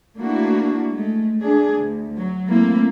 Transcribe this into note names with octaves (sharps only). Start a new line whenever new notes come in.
A3 A#3 D4 E4 F#4
G#3 A3
A3 D4 G#4
D2
F#3
A3 A#3 C4 E4